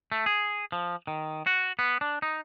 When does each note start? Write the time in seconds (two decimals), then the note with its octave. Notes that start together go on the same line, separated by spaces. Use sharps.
0.12 A3
0.26 G#4
0.72 F3
1.07 D#3
1.47 F#4
1.79 B3
2.01 D4
2.22 D#4